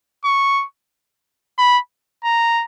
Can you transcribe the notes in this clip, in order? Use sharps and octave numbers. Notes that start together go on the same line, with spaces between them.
C#6
B5
A#5